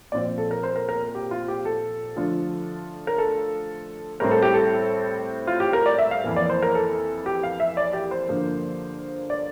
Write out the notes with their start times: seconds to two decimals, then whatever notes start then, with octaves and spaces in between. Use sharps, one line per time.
0.12 A#2 F3 C4 F4 D5
0.38 A4
0.51 A#4
0.63 C5
0.76 A#4
0.89 A#4
1.15 G4
1.31 F4
1.48 G4
1.65 A4
2.16 D3 F3 A3 D4 F4
3.07 A#4
3.18 A4
4.20 A2 G3 C4 A#4
4.31 A4
4.42 G4
4.54 A4
5.47 F4
5.60 G4
5.73 A#4
5.86 D5
5.98 E5
6.11 F5
6.24 F2 E3 A#3
6.36 D5
6.50 C5
6.62 A#4
6.75 A4
7.26 G4
7.43 F5
7.60 E5
7.77 D5
7.93 G4
8.11 C5
8.28 G2 D3 F3 A#3
9.30 D5